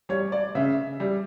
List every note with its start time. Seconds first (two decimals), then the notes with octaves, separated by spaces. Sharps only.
0.09 G3 C#5
0.32 D5
0.55 C#3 E5
1.00 G3